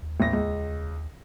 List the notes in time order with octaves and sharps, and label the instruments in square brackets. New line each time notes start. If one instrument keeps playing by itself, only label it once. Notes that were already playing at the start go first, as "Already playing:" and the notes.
[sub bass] D#2
[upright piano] A1 A#6
C#2